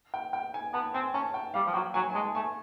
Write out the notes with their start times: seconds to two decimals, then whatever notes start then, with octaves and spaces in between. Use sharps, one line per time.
0.14 G5
0.33 G5
0.54 G#5
0.74 B3 A5
0.94 C4 G#5
1.14 C#4 A5
1.34 G5
1.54 G3 F5
1.66 F3
1.74 F#3 G5
1.94 F#3 G#5
2.10 G#5
2.15 G#3 A5
2.35 A3 G#5